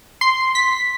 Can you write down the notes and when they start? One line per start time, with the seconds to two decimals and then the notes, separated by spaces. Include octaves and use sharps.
0.21 C6
0.55 B6